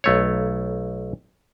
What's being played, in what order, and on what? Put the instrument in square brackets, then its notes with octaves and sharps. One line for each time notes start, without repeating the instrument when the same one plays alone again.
[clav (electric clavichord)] B1 A3 C#5